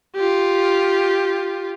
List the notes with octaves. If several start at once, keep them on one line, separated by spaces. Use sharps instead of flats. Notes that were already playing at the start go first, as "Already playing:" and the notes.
F4 G4